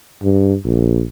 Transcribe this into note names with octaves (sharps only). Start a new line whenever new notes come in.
G2
A#1